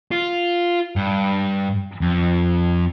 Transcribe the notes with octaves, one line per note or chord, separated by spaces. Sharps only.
F4
G2
F2